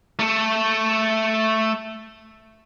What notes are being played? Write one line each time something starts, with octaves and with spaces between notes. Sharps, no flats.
A3 A4